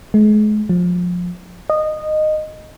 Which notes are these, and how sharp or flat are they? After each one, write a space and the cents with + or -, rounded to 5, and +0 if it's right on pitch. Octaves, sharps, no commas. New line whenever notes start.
G#3 +35
F3 +25
D#5 -15